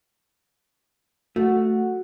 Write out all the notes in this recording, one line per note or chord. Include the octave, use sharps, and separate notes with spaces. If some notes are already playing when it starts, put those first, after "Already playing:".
A3 F#4